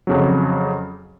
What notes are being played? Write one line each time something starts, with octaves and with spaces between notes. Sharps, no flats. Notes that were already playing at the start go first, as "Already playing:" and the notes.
F2 C#3 F#3